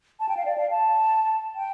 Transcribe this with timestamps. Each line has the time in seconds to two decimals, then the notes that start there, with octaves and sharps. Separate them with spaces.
0.20 A5
0.29 G5
0.37 F5
0.45 D5
0.58 F5
0.71 A5
1.55 G5